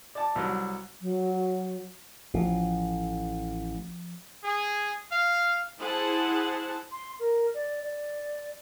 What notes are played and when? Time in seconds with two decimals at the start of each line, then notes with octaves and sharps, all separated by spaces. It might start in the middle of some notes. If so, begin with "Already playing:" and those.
0.15 D5 A5
0.36 C2 F#3
1.01 F#3
2.34 A1 F3
4.44 G#4
5.12 F5
5.79 E4 G#4 C5 F#5 A5
6.91 C6
7.20 A#4
7.54 D5
7.82 D5